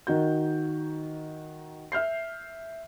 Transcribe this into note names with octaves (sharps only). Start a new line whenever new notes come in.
D#3 D#4 F#4 G6
E5 F6 G6 C7